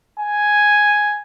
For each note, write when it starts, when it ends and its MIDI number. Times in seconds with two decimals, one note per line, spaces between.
0.19 1.22 80